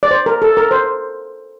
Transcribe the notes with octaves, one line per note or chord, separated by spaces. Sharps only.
D5
C5
A#4
A4
A#4
C5